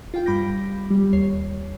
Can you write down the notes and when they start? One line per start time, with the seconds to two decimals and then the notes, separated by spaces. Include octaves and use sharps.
0.14 F4 F5 G5
0.26 G2 G3 B5 D6 G6 A#6
0.91 G3
1.13 D#2 C#5 C7